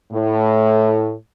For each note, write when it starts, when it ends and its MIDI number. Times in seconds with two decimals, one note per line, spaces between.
0.12 1.12 45